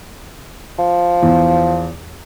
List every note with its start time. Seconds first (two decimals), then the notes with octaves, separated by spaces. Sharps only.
0.79 F3
1.23 E2